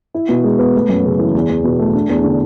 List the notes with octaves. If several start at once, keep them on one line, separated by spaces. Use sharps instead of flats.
E4
B2
G#3
B3
A3
F#2
C#3
E3
E2
E2
B2
A3
D4
E2
D3